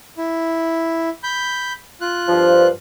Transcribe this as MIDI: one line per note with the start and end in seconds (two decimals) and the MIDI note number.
0.17 1.09 64
1.23 1.73 83
1.23 1.73 91
2.01 2.67 65
2.01 2.67 90
2.29 2.70 43
2.29 2.70 53